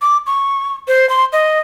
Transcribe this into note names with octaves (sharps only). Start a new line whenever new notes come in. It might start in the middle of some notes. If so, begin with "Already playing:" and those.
D6
C#6
C5
C6
D#5